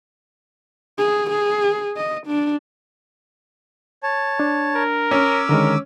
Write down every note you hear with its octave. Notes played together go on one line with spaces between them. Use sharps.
G#4
G#4
D#5
D4
C#5 A5
D4
A#4
C#4 D6 E6
D3 D#3 G#3 A#4